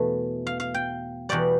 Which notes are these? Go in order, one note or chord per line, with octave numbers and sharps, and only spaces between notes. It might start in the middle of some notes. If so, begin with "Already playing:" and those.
Already playing: E2 B2 A3
F5
F5
G5
E2 B2 G3 D5